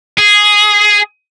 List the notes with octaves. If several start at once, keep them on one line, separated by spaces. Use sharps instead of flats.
G#4